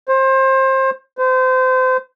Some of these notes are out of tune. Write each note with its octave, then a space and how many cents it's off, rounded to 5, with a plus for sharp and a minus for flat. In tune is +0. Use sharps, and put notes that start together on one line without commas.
C5 +25
C5 -30